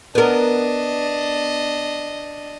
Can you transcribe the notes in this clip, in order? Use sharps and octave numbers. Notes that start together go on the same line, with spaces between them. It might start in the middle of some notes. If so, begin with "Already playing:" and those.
B3 D4 A#4 D#5